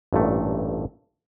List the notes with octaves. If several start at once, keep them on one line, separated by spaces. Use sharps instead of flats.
A1 G2 A#2 A3